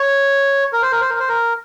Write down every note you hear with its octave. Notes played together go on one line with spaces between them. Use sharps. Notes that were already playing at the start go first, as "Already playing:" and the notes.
Already playing: C#5
A#4
C5
A#4
C5
A#4
C5
A#4